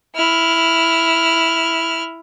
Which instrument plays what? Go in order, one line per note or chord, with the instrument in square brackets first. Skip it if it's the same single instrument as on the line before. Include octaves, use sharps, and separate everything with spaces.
[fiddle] E4 F6